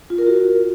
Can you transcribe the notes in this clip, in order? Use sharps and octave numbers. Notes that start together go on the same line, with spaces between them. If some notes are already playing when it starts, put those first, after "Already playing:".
F4
A#4
F#4